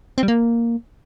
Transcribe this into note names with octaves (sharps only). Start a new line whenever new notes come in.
C4
G3
A#3